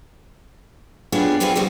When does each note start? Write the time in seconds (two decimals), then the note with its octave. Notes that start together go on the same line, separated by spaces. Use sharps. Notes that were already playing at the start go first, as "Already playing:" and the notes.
1.12 B3 D4 F4 G4 G#4 C#5
1.40 F#3 G3 C4 F4 G#4 B4
1.55 A#2 C#3 F3 G3 F#4